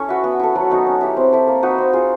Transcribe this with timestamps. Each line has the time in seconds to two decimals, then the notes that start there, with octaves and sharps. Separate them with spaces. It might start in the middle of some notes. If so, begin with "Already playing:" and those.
Already playing: C#4 E4 A4 C#5
0.09 F#4 B4 E5
0.24 B3
0.39 E4 A4
0.55 F#3
0.70 B3 D#4 F#4
0.86 C#4
1.01 E4 G4
1.17 C4
1.33 E4 A4
1.47 A#3
1.63 D#4 F#4 B4
1.78 C4
1.93 F4 G#4